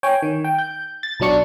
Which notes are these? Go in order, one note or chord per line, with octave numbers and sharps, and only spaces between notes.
C#5 G5 G#5
D#3
G5
G6
A6
B1 B2 F#3 D4 C#6